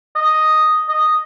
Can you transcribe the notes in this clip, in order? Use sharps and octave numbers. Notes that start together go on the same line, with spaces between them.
D#5
D#5